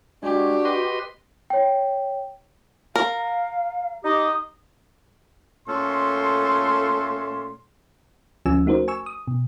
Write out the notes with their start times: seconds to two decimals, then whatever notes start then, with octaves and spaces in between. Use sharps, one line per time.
0.23 G#3 D4 F#4 G4
0.65 B4 D#5 C6
1.50 C#5 G5
2.96 A#4 F5
4.05 D#4 G4 D#5 D#6
5.68 A#2 A3 C#4 A4 C6
8.46 D2 F3 C#4 F4 G#5 E6
8.66 A3 D#4 F#4 A#4 C5
8.88 G#5 C#6 E6
9.06 D#6
9.27 B2